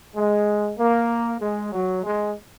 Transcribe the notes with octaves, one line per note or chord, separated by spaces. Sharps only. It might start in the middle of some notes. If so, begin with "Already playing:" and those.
G#3
A#3
G#3
F#3
G#3